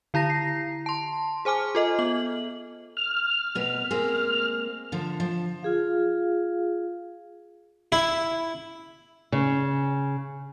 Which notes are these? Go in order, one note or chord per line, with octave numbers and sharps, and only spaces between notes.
D3 E4 A#5 A#6
C7
A5 C6
G#4 C5 G#5 D6 F6
F4 A4 D#5
B3 F#7
F6
D2 B2 B4
G#3 A#3 C4
D3 F3
F3
F4 G#4 F5
E4
C#3